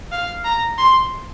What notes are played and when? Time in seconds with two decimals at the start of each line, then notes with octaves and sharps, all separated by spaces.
0.12 F5
0.45 A#5
0.78 C6